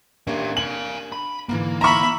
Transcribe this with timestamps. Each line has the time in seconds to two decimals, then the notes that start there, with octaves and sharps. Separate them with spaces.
0.27 A#3 C#4 D4 G4
0.57 F5 G#5 F#7
1.12 B5
1.49 G#2 D3 E3 A#3
1.81 E5 A#5 B5 C#6